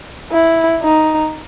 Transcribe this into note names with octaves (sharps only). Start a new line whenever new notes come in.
E4
D#4